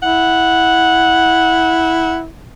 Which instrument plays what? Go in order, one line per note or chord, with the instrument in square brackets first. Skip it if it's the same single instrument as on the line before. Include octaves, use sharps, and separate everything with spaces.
[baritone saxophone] E4 [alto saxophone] F#5